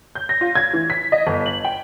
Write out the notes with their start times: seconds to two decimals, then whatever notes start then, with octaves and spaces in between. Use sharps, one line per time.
0.15 G6
0.29 A#6
0.41 F4
0.55 G#6
0.73 E3
0.90 B6
1.12 D#5
1.27 G1
1.46 F#7
1.65 G5